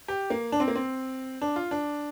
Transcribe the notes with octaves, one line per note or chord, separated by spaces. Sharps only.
G4
A#3
D4
C4
A#3
C4
D4
F4
D4